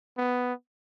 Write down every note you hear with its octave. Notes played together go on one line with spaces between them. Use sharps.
B3